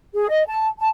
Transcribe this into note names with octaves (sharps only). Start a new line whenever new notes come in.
G#4
D#5
A5
A5